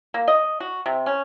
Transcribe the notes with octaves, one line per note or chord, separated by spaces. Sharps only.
A#3
D#5
F#4
C3
C#4